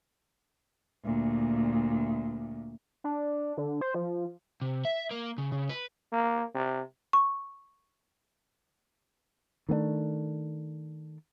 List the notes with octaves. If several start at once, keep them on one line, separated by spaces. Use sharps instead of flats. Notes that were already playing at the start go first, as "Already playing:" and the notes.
D2 A#2
D4
D3
C5
F3
C3
E5
A#3
C#3
C#3
B4
A#3
C3
C#6
D#3 A3 A#3 D4